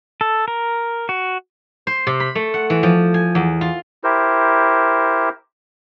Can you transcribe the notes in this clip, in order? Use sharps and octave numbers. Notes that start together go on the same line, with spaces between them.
A4
A#4
F#4
C5
C3
B5
A3
F#5
E3
F3
G#5
E2
F4
E4 G4 A#4 C5